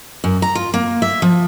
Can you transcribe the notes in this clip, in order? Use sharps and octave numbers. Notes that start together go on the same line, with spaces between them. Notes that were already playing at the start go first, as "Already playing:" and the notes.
F#2
A#5
F4
A#3
E5
F3